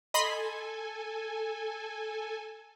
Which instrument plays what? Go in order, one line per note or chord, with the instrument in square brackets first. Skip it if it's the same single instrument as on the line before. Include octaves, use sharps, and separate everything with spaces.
[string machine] A4 G#5 [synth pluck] D#5 B5 C6